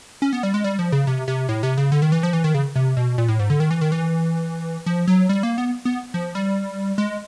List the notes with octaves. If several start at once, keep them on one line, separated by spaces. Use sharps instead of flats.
C#4
B3
G3
G#3
G3
F3
C#3
C3
C3
A2
C3
C#3
D3
D#3
E3
F3
E3
D#3
C#3
C3
B2
A#2
A2
G#2
D3
D#3
E3
D#3
E3
F3
F#3
G3
A#3
B3
B3
F3
G3
G#3